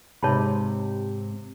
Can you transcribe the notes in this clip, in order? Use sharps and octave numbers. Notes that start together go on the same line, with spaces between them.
G#2 C3 C#5 A5 B5